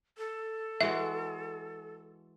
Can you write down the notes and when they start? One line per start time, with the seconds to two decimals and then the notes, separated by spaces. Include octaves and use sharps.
0.18 A4
0.81 E3 G#3 F#4 E5